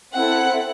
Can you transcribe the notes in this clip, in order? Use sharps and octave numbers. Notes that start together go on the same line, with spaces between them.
C4 E4 A4 F#5